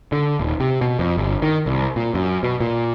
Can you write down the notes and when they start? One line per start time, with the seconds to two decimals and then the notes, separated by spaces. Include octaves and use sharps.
0.12 D3
0.40 D#1
0.60 C3
0.81 B2
0.99 F2
1.17 G1
1.42 D#3
1.66 C2
1.96 A#2
2.15 F#2
2.43 B2
2.60 A#2